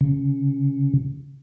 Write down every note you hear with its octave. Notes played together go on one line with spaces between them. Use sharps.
C#3